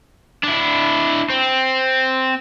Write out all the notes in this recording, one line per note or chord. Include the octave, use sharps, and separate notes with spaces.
D4 E4
C4